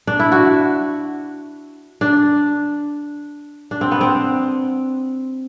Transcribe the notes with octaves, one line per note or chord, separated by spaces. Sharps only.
D4
E4
F#4
D4
D4
C4
B3
C4